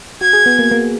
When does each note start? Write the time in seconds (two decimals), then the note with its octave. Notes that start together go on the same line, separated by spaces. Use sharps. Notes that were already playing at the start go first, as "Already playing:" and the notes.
0.21 F#4 G#6
0.33 G#4
0.46 B3
0.59 A#3
0.71 A#3